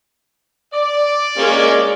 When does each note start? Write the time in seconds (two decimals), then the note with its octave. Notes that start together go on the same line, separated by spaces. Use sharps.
0.73 D5
1.38 G#3 A#3 C#4